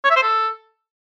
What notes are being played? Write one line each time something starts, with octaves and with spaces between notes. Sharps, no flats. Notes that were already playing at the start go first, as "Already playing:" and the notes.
C#5
E5
C5
A4